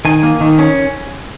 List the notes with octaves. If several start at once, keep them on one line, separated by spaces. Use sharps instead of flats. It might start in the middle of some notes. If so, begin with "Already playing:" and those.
D#3 G#5
A#3
D#3
C#4